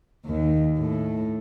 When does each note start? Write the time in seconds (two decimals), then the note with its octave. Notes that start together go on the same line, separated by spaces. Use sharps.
0.24 D#2
0.78 A2